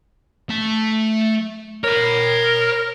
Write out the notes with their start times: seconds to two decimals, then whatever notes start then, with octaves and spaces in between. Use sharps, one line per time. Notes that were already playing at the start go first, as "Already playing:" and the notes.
0.49 A3 A5
1.84 A#4 C#5 B5